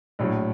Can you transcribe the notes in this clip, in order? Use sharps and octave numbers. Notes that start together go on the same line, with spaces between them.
A#1 A2 F#3